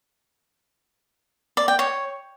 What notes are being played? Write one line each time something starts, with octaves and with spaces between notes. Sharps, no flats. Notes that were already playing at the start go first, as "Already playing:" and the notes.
D5
G5
C#5